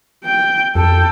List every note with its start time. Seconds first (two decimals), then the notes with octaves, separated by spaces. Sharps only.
0.24 G5
0.75 F2 A4 G5